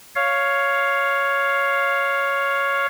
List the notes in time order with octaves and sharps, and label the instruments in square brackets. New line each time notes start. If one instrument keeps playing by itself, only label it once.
[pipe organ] C#5 F5